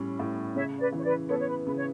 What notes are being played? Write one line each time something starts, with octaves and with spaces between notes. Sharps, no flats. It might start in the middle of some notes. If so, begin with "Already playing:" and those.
Already playing: A2 G3 C#4
A2
C#3 C#5 E5
B4 D5
E3
C#5
B4 D5
B3 A4 C#5
C#5
B4
C#3 B4
C#5